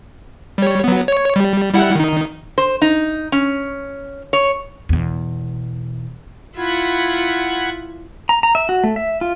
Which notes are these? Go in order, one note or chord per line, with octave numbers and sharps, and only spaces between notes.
G3 C#5
F#3 B3
C#5
G3
G3 E4 F#5
D#3 D#4
C5
D#4
C#4
C#5
E2 B2
E4 F4 F#5 B5 G#6
A#5
A#5
E5
F#4
A3
E5
F4